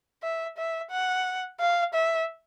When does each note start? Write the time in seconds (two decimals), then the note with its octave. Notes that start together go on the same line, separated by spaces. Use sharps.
0.23 E5
0.58 E5
0.91 F#5
1.60 F5
1.94 E5